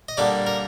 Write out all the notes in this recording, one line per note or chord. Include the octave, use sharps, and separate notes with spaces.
D#5
D3 G3 A#3 D5
A#4